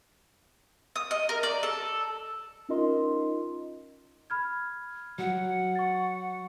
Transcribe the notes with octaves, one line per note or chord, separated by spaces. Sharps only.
D#6
D#5
A#4
D5
A4
C#4 D#4 F4 A#4 D#5 C6
B5 F6 G#6
F#3 F#5
C#6 A6